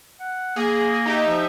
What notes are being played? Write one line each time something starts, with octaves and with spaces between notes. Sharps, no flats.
F#5
A#3 G#4
D#4 G4 E5
F3